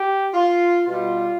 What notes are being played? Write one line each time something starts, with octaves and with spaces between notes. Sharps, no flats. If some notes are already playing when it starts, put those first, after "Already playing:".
Already playing: G4
F4
B2 G3 F4